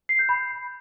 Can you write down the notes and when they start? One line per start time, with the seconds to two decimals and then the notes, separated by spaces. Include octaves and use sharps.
0.09 C7
0.19 G6
0.29 B5